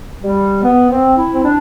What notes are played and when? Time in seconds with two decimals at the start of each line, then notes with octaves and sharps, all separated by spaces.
0.23 G3
0.63 B3
0.90 C4
1.17 E4
1.33 C4
1.44 D4